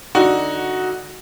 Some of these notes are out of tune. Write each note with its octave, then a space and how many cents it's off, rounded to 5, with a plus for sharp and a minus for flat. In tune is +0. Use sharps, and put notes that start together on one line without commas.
D3 +0 D#4 +10 F#4 +0